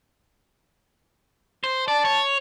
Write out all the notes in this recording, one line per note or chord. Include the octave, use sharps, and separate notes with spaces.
C5
D5 A5
C#5